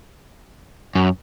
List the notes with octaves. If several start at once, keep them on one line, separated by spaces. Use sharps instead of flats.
F#2